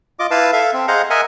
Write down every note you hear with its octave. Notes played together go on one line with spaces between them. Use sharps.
F4 D#5 D6
E4 B4 F5 A5
A4 E5 F5
C4
G#4 C5 D#5 F5 F#5 A#5
A#4 D#5 E5 F#5 G#5